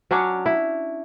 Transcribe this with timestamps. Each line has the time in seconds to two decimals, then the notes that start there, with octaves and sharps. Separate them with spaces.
0.11 F#3 C#4 D4 C#5
0.46 E4